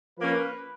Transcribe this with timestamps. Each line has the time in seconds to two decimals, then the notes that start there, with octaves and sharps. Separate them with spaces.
0.17 F3 A#3 C#4 B4